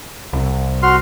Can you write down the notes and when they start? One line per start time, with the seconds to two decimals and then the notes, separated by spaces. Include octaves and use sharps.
0.33 C2
0.83 F#4 C6 F6